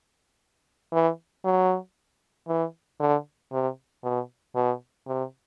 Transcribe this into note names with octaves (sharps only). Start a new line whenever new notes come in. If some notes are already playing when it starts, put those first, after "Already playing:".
E3
F#3
E3
D3
C3
B2
B2
C3